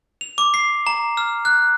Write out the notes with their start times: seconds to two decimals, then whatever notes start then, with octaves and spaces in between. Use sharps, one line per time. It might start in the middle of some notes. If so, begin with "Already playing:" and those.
0.21 F7
0.38 D6
0.54 C7
0.87 A#5
1.17 F6
1.45 F#6